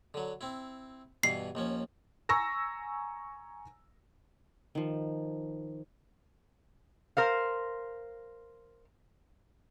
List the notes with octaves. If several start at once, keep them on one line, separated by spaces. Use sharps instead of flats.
D3 F#3
C4 E4
G2 B2 E3 C7
D#2 F3 C#4
G#5 A#5 C#6 E6 A#6
D#3 F3
A#4 C5 F5